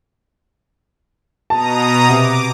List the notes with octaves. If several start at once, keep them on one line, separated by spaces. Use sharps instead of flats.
B2 A5 A#5 D#6
C3 D6